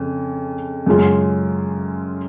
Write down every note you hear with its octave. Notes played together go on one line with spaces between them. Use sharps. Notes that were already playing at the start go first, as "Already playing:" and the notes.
Already playing: F2 C#3 C#4
F#2 C#3 G#3 C#4 F4